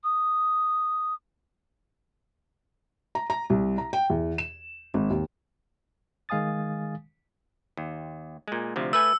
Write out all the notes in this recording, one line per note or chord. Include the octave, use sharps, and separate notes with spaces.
D#6
A#5
A#5
C2
A#5
G5
E2
E7
G#1
D#2
D#3 G#3 F5 G#5 D#6 A6
D#2
A#2 G#3
D2 C3 F3
A3 B4 G#5 E6